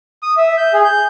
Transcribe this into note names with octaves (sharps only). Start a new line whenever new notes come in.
D#6
E5
G6
G#4
G6